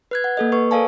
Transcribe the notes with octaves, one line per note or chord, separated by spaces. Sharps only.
B4 F#6 G#6
F#5
A#3 A4 D#5
B4 C#6
A4 A#4 D5 F5 G#5 A5